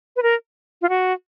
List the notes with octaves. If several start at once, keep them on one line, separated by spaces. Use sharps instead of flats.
B4
A#4
F4
F#4